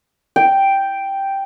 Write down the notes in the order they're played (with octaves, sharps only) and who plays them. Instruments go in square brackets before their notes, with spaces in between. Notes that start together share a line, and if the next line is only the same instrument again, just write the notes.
[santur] G5